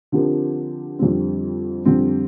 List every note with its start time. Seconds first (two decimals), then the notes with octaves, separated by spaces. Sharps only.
0.12 D3 F3 C4 G4 A#4
0.99 F2 D3 G3 C4
1.86 F2 D3 G3 C4